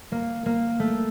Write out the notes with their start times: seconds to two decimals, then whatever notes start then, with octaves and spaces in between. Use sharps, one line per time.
0.12 A#3
0.46 A#3
0.80 A3